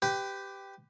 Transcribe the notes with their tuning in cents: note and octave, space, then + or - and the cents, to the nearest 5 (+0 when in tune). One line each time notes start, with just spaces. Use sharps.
G4 +0 B4 +30